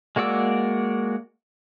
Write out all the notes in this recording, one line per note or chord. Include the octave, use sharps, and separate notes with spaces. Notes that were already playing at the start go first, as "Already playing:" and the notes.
G#3 A#3 F#4 D5 E6